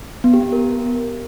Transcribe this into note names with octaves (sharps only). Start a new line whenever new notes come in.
B3
G4
B3
A#4